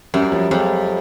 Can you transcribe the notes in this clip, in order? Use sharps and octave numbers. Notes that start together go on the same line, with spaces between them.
F#2 G3
F#3
F3 G3
F2 F#3 G#3